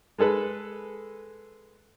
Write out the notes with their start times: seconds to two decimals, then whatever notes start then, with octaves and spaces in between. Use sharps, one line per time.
0.18 G#3 G#4 A4 B4